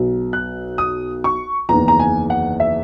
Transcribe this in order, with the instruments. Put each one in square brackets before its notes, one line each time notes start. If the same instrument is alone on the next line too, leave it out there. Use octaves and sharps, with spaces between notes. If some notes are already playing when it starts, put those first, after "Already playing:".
Already playing: [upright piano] B1 B2
F#6
D#6
C#6
F#1 E2 D#3 A#5
A#5
G#5
F#5
E5